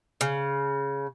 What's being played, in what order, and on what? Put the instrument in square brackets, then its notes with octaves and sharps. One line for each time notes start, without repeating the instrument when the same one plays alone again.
[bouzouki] C#3